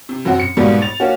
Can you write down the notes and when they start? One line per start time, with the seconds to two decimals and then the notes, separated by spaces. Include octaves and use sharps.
0.09 C3
0.25 F#2 F#3 C4 F#5
0.40 C#7
0.57 G#2 B2 F#3 G3 A#3 B3
0.82 A6 F7
1.00 A#3 C#4 F#4